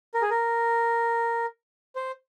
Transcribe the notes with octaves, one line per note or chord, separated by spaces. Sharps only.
A#4
G#4
A#4
C5